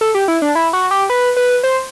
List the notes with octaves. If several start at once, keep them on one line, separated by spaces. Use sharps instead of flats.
A4
G4
E4
D4
E4
F#4
G4
B4
B4
C5